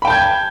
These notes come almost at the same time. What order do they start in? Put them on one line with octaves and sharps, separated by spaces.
B5 G5 A5 G6 G#6